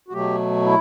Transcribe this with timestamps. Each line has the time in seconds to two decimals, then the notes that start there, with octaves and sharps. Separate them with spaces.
0.08 F#4
0.12 B2 F#3 A3 G4
0.65 E4